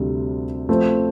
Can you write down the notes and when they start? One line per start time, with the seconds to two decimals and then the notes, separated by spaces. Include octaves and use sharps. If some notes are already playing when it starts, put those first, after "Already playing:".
Already playing: D2 C3 G3
0.69 F3 A3 C4